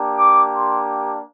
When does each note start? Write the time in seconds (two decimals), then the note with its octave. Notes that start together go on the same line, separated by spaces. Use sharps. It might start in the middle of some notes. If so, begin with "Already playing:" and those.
Already playing: A#3 D4 G4
0.17 D6
0.51 C6